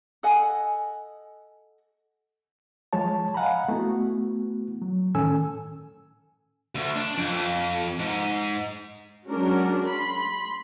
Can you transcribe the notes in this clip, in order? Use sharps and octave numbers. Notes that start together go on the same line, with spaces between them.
A4 D#5 F#5 G#5
F3 G#3 C#5 A5
D#5 F5 F#5 G#5 A#5 B5
A3 B3 E4 F#4
F#3
A2 D#3 C#4 A4 G#5 E6
D2
D4
F2
G#2
F#3 G#3 C#4 D4 F#4 A#4
B5 C6